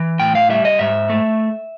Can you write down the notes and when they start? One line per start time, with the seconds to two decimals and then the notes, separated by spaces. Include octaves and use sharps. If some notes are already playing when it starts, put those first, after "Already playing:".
Already playing: E3
0.20 A2 G5
0.35 F5
0.50 G3 E5
0.65 D#5
0.79 G#2 E5
1.10 A3